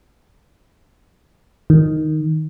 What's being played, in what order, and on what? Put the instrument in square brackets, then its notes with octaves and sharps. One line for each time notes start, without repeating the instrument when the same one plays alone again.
[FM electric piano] D#3